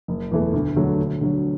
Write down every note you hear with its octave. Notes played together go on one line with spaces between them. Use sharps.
F#1
E2 E3 A3
D2
D3 F#3 A3
D2
D3 F#3